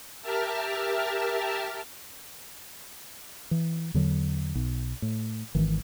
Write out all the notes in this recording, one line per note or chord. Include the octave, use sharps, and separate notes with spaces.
G4 A#4 E5 A5 F6
E3
E2 D3 F#3
B1
A2
G#1 D#3 E3